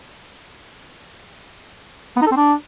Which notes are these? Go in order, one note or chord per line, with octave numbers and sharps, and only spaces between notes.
B3
D#4
A4
C4
D4